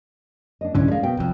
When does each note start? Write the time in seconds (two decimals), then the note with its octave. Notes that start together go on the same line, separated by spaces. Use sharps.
0.61 D4 D#5
0.75 C2 G#2 D3 C#4 D4 E4
0.88 G3 G#3 D5 F5
1.03 B2 G5
1.17 F1 C2 F2